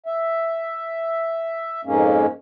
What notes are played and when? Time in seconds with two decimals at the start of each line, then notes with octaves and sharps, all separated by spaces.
0.06 E5
1.85 F2 G#2 G#3 A#3 C#4